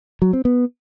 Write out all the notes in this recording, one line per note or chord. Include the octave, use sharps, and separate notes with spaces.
F#3
C4
B3